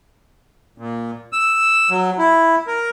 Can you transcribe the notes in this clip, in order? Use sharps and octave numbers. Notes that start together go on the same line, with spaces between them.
A#2
E6
F#3
E4
A#4